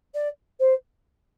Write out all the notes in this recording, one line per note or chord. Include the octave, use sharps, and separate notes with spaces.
D5
C5